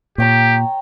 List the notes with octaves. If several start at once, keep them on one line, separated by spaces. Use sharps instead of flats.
A#2 G4 C#5 G5 A#5